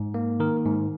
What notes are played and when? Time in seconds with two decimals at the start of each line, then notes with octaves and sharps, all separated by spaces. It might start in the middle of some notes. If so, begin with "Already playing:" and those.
Already playing: G#2
0.14 A#3
0.40 D#3 A#4
0.65 G#2